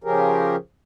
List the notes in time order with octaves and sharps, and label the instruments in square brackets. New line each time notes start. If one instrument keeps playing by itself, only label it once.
[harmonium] C#3 F3 C#4 G4 G#4 A#4